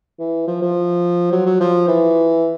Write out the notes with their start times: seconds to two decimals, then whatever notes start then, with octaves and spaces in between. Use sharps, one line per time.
0.19 E3
0.47 F3
0.62 F3
1.32 F#3
1.46 F#3
1.60 F3
1.88 E3